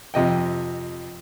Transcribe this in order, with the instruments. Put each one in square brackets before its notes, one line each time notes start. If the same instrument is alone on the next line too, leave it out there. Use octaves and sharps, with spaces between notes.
[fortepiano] F2 C3 D#5 G5